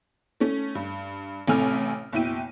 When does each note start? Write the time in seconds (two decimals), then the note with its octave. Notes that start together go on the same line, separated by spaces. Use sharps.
0.40 A3 C#4
0.75 G2
1.48 A1 C3 A3 G#5 F6
2.13 F#1 B2 E4 G5 D#7